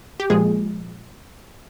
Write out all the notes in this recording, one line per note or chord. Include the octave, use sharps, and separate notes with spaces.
G4
A#2 F3 G#3 G#4